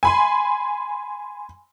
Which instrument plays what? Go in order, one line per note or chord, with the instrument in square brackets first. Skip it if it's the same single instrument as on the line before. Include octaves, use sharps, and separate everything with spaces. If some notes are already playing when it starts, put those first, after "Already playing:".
[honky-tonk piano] G#5 B5 C6